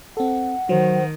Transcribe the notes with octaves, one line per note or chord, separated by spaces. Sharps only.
C4 A4 F#5
D#3 F#3 C5